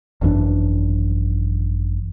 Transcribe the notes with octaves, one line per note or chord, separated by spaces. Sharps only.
G#1 F#2 E3 D4